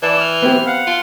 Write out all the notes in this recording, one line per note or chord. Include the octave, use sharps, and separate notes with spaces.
E3 D5 A5
F6
B3 C4 G4
F5 F#5
F4